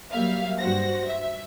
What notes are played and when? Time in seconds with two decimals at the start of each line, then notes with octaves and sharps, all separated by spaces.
0.11 F#3 G3 A#3 E5 F5
0.59 G2 F#4 C5 F#5 A#6
1.07 E5